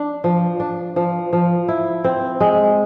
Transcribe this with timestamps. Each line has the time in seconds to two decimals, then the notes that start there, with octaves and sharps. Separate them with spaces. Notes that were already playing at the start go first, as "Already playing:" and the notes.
Already playing: D4
0.24 F3
0.60 D4
0.96 F3
1.33 F3
1.68 E4
2.04 C4
2.40 G#3